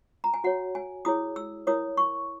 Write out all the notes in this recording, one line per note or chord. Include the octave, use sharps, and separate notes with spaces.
A#5
G#5
F#4 C#5 F#5
G#5
E4 G#4 C#5 D#6
E6
E4 A#4 C#5 D#6
C#6